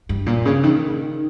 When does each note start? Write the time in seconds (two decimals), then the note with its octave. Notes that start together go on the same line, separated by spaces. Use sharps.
0.09 G2
0.26 A#2
0.45 C#3
0.63 D#3